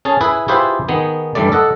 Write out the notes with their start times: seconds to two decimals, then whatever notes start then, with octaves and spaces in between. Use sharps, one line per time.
0.05 C#4 G#4 A5
0.21 E4 G#4 B4
0.48 E4 F4 G4 G#4 B4 C5
0.88 D#3 B3 G#4
1.35 G2 E3 G3 A3 D5
1.52 A4 D#5 F#5